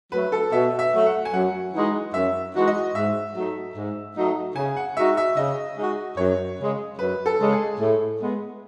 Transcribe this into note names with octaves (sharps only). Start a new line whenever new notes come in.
F#3 A3 B4
A4
B2 E5
E5
F#3 A3
F#5
G#5
F#2 F#5
E3 G#3 D#4 F#4
F#2 E5
E3 G#3 D#4 F#4
D#5
G#2 E5
F#3 A3 D#4
G#2
F#3 A3 D#4
C#3 G#5
F#5
G#3 D#4 F#4 E5
E5
C#3 D#5
G#3 D#4 F#4
F#2 C#5
C#3 G#3
F#2 B4
A4
C#3 G#3
G#4
A2
G#3 B3